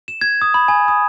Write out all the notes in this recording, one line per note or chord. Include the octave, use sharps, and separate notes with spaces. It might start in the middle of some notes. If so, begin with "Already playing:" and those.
E7
G#6
D#6
B5
G#5
D#6